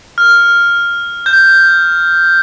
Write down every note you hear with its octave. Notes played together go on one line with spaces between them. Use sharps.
F6
G6